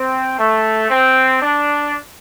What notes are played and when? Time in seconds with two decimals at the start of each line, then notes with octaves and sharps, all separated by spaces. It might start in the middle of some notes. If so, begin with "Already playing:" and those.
Already playing: C4
0.38 A3
0.90 C4
1.42 D4